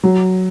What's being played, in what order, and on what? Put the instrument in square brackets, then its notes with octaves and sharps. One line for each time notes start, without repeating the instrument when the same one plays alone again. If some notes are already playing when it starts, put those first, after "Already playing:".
[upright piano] F#3